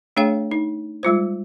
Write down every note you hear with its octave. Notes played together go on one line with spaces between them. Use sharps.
A3 D4 G#4 C#5 F5 G5
D#4
G3 G#3 F4 C5